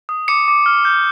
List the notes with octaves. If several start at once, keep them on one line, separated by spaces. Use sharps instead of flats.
D#6
D6 C#7
D6
F6
G6